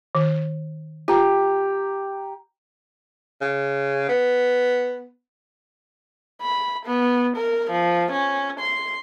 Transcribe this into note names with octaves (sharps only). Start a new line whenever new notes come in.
D#3
F4 G4 A#5
C#3
B3
B5
B3
A#4
F3
C#4
C6